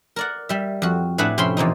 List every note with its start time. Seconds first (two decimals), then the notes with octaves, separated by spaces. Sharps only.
0.16 A#4 D5 F#5
0.49 G3 E5
0.82 F2 F#4
1.18 A2 D4 G#4 B4 E5 F#5
1.38 F2 C3 C#4 G5 B5 C6
1.57 E2 A#2 C4 D#4